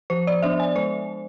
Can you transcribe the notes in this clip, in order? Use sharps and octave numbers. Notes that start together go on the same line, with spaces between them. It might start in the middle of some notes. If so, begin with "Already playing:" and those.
F3 C5
D5
B3 D4 E5
G#5
G#3 C5